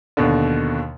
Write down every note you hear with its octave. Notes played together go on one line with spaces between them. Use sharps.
D#2 B2 D3